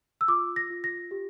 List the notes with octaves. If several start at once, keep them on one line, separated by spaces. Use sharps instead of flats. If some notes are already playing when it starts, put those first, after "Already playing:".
E6
F4 D6
A#6
F4
A#6
G4